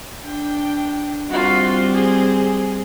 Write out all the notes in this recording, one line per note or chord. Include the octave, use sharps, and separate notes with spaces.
D4 G5
G3 C4 F4 F#4
G#4